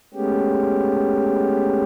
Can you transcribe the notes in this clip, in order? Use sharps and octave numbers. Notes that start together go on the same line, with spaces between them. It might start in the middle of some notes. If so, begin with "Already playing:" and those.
G#3 A3 B3 C#4 G4